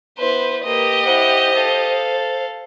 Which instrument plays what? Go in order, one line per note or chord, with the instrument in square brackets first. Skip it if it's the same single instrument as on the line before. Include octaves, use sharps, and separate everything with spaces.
[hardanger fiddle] B3 E4 [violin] B4 C5
[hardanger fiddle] A#3 B4 [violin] G4 D#5
[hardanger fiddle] E4 F#5 [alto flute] C5
[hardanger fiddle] A4 F5